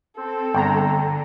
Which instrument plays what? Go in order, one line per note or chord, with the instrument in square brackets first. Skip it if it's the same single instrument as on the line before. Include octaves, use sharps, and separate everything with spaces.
[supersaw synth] C4 [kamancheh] A4
[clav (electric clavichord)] G1 [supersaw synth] D3 [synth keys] G5 A#5